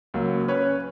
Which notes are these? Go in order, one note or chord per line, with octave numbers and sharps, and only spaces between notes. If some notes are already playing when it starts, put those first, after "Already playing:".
C#2 F#3 A#3
C#4 B4 C#5